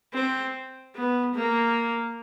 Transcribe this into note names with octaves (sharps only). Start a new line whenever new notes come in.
C4
B3
A#3